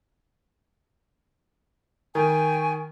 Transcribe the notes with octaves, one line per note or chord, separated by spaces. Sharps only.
D#3 G5 G#5 C#6